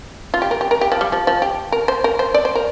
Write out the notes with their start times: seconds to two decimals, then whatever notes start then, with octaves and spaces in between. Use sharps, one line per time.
0.34 F4
0.42 G4
0.51 A#4
0.61 G4
0.71 A#4
0.81 G4
0.92 F3
1.01 G3
1.12 F3
1.27 F3
1.42 G4
1.72 A#4
1.88 C5
2.04 A#4
2.19 C5
2.34 D5
2.45 C5
2.55 A#4